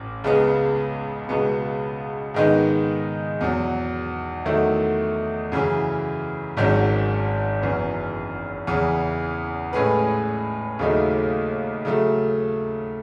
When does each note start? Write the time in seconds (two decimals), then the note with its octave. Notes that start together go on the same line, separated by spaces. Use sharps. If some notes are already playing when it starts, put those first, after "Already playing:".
Already playing: A1
0.24 C#2 C#3 G#3 B3
1.29 C#2 B2 G#3 B3
2.34 G#2 D#3 G#3 B3 D#4
3.41 E2 B2 F#3
4.45 E2 D#3 F#3 A3 E4
5.52 F#2 C#3 E3
6.57 G#1 G#2 D#3 F#3 C#4
7.62 F#1 F#2 E3 B3
8.67 E2 C#3 E3
9.73 A2 G#3 C#4 G#4 B4
10.79 D#2 C#3 F#3 A3 D#4
11.85 C#3 F#3 A3